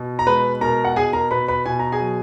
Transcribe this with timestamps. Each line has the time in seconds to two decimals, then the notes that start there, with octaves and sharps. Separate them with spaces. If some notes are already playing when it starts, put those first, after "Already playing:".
Already playing: B2
0.19 A#5
0.27 G#3 B4 B5
0.61 B2 A#4 A#5
0.85 F#5
0.96 B2 G#4 G#5
1.13 A#4 A#5
1.31 B2 B4 B5
1.48 B4 B5
1.66 B2 G#5
1.79 A#5
1.92 G#4 G#5
2.00 F#3